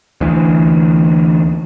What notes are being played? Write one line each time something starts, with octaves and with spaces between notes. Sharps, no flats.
D2 E3